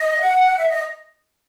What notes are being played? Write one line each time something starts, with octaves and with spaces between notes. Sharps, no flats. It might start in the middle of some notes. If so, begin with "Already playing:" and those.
Already playing: D#5
F#5
E5
D#5